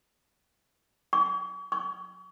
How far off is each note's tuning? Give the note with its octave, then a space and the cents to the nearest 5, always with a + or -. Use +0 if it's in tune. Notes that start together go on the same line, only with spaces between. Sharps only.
C#6 +45
C#6 +35